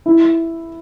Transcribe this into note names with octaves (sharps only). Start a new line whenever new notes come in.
E4